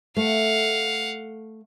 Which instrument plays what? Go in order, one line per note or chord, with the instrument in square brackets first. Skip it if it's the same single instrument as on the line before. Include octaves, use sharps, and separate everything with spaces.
[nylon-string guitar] A3 [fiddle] F5 F#5